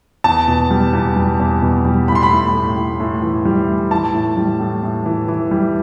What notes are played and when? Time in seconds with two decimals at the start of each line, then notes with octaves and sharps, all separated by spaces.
0.24 E2 A5
0.48 B2
0.71 G3
0.93 E2
1.16 G3
1.40 E2
1.62 B2
1.85 G3
2.08 A2 B5
2.15 C6
2.23 B5
2.31 A2
2.53 A2
2.77 A2
3.00 A2
3.22 E3
3.45 G3
3.68 A2
3.91 E3 A5
4.14 A2
4.37 G3
4.60 A2
4.83 A2
5.06 E3
5.28 E3
5.51 G3